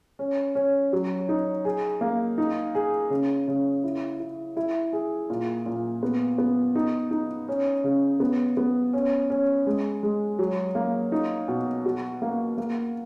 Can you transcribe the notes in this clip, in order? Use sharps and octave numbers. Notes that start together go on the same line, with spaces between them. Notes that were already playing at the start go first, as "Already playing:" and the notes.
C#4
C#4
F#3
D#4
G#4
A#3
D#4
G#4
C#3
C#3
E4
E4
E4
G#4
A#2
A#2
B3
B3
D#4
D#4
C#4
C#3
B3
B3
C#4
C#4
G#3
G#3
F#3
A#3
D#4
B2
F#4
A#3
A#3